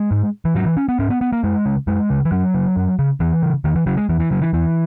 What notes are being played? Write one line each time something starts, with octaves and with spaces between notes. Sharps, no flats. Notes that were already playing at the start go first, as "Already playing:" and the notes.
Already playing: G#3
G#2
E3
G#2 F#3
E3
C#4
B3
G#2 C#4
B3
B3
A#3
F#2 G#3
C#3
F#2 G#3
C#3
E3
F#2 F#3
C#3
F#2
C#3
E2 E3
C#3
E2 D#3
E3
C#3 F#3
G#3
E2 E3
E3
C#3 F#3
E3
E2 E3